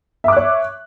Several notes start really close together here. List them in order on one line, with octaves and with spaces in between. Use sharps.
E5 D6 F#6 C#5